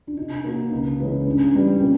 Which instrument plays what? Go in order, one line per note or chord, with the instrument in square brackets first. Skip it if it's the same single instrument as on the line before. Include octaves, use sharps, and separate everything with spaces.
[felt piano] D4
[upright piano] C3 [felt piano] D#4
[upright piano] D#3 F#3 A#3
C#2
C#3 E3 G#3 C#4
[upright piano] G2 [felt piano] C#4
[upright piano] E3 G3
[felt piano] C#4
[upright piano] A#2 [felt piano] C4